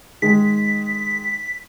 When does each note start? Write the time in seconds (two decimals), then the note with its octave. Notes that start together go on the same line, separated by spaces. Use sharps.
0.22 D#3 G#3 B6